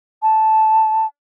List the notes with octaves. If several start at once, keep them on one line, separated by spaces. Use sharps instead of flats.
A5